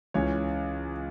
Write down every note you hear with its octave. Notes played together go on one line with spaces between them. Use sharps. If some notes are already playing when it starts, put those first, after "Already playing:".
C#2 C#3 E3 C#5